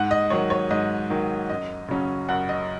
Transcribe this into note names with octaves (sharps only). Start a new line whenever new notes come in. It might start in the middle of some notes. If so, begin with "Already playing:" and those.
Already playing: G#2 F#5
D#5
D#3 F#3 C#5
C#5
G#2 D#5
D#3 F#3
F#2 D#5
C#3 F#3 C#4
F#2 F#5
D#5